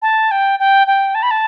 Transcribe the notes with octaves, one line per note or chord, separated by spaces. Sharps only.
A5
G5
G5
G5
A5
B5
A5